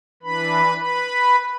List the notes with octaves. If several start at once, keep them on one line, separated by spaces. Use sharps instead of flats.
E3 D4 B4 B5
B4 B5